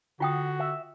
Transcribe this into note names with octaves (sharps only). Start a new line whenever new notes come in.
D3 F4 F#4 G5 D#6
E5